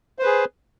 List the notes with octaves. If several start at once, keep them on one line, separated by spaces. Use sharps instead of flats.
G#4 B4 C5